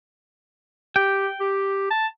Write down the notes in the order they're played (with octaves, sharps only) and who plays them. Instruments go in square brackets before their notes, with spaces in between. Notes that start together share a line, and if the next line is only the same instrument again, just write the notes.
[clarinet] G4 [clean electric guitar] G5
[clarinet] G4
A5